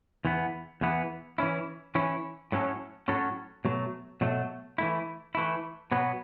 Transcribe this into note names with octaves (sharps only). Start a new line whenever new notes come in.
E2 E3 B3
E2 E3 B3
E3 C#4 E4
E3 C#4 E4
A2 F#3 C#4 A4
A2 F#3 C#4 A4
B2 F#3 A3
B2 F#3 A3
E3 A3 E4
E3 A3 E4
B2 F#3 B3